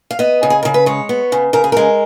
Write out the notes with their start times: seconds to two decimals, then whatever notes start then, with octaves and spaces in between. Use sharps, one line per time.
0.11 F5
0.19 B3 D#5
0.43 C#3
0.50 G#4
0.63 C#3 A#4
0.74 B4
0.86 G#3 C#5
1.09 B3
1.32 C#3
1.53 C#3 A#4
1.64 G#4
1.72 G#3 A#4